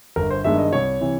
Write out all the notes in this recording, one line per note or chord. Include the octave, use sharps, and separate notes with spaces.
G1 A#4
C5
G2 D#3 G#3 B3 E5
D#5
C2 C#5
C3 E3